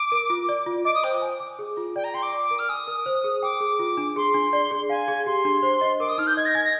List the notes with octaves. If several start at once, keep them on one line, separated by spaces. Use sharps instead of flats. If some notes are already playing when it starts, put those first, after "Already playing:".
Already playing: D6
A#4
F4
D5
F4
D#5 D6
D#6
C5 G5
G#5
D6
G#4
F4
D5 G5
A#5
G5 C6
D6
D5
A#4
F6
G#5 D#6
A#4
C5
G#4
G5 D6
G#4
F4
D4
G#4 C6
D4
D5
G#4
F5 G#5
G#4
G4 C6
D4
C5
D#5
A#4 D6
D#6
D#4 F6
G6
D#5 G#6
A#6
G#5 G#6
A#6